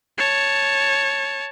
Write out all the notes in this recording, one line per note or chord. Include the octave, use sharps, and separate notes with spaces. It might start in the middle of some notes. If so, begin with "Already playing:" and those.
C#5 A5